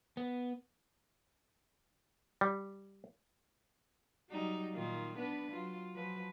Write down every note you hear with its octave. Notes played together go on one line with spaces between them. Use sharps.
B3
G3
F#3 G3 D#4
A#2 D#3 F4
B3 D4 B4
F#3 F4
F3 F#3 B4